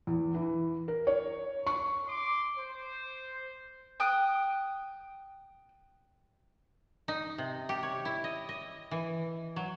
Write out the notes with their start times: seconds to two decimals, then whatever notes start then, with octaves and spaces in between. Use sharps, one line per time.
0.07 E2
0.34 E3
0.88 A#4
1.07 C#5
1.67 C#6
2.07 C6 D6
2.58 C5
4.00 G5 D#6 F#6
7.08 D#4
7.38 C3
7.69 G4
7.83 C#5
8.05 E4
8.24 D#5
8.49 D#5
8.91 E3
9.56 F#3